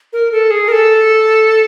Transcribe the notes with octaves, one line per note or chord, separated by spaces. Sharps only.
A#4
A4
G#4
A#4
A4